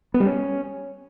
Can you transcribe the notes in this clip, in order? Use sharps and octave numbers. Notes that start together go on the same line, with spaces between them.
B3
G3
C#4